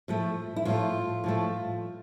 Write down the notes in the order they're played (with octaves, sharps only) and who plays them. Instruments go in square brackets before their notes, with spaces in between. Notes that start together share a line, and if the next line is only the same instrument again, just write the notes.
[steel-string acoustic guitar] A2 F3 A3
E4
A2 F3 A3 F4
A2 F3 A3